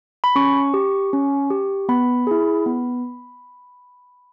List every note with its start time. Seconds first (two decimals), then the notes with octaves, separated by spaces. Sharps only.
0.24 B5
0.36 C#4 C#6
0.74 G4
1.13 C#4
1.50 G4
1.89 B3 B5
2.27 E4 G#4
2.66 B3